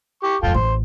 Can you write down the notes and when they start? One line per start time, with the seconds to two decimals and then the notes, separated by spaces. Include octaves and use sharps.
0.23 G4 C#6
0.43 F2 A2 F4 A4 G5
0.54 A1 C5